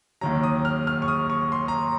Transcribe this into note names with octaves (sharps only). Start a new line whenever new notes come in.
D#2 D#3 F#3 A#5
D#6
F6
F6
C#6
D#6
C#6
C6
A#5